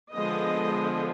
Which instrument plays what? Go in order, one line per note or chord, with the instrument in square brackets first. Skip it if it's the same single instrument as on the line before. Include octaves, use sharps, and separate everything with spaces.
[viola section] D3 F3 G#3 B3 D#5